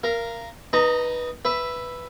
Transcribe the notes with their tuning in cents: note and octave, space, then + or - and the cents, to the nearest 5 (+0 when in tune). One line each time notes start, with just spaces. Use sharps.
A#4 +0 F5 -30
D#4 +0 B4 -15 A#5 -30
B4 +0 E5 +5